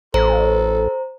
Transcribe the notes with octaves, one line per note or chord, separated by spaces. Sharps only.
A1 A4 C5 A#5